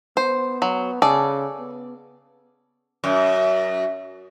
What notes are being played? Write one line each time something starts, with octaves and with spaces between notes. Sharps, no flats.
B3 C5
F#3
C#3 G#4 A4 D5
B3
F#2